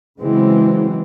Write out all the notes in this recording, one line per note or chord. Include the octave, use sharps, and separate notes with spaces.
C#3 E3 F#3 G#3 C4